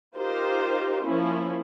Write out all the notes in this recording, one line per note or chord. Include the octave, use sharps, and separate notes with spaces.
D#4 F4 G4 A#4 C5
F3 A#3 C#4 E4